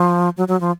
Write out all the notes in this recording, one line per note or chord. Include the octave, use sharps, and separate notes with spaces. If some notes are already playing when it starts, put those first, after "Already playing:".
Already playing: F3
F#3
F#3
F3